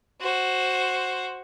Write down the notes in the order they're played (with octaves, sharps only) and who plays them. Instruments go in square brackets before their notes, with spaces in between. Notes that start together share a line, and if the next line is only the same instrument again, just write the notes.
[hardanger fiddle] F#4 C5